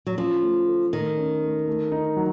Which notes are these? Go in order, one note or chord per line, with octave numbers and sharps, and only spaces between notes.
F#3
F3 C#4
A3
A4
D#3 A3
C#4
A3
A3
D#4
F#3